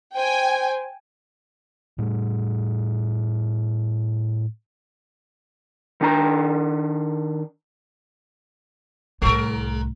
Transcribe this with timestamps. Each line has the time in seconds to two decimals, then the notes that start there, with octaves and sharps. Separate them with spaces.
0.16 C5 G5 G#5
1.98 A2 G3
6.01 D#3 D4 A#5
9.22 C2 A2 G#3 A#4